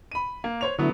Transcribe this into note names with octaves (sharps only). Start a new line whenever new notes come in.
B5 D#7
A#3
C5 C#5 F7
D3 F#3 A3 B3 E4